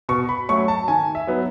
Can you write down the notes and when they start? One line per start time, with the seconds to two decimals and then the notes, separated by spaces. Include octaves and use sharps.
0.09 B2 C#6
0.29 B5
0.49 F#3 A3 C#4 C#6
0.68 A5
0.88 D#3 G#5
1.15 E5
1.27 F#3 B3 D#4